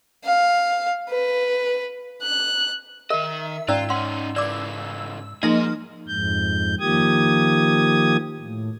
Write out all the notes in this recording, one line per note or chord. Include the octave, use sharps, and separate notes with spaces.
F5
B4
F#6
D#3 A#4 D#5 E5
G#2 C#4 F4 D5 A#5 E6
C#4 D#4 F#5 C6
C#3 E3 D5 D6 E6
G#2 F3 A#3 D#4 G#4 D#5
F2 G#2 G6
D#3 F3 A#3 G4 D#6 G#6
A2